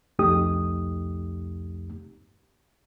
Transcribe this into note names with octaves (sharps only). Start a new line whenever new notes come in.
C2 F2 A3 D#4 G4 D#6